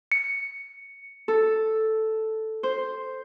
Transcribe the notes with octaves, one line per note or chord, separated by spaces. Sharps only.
C#7
A4
C5